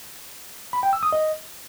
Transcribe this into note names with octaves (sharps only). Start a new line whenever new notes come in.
B5
G5
E6
D#6
D#5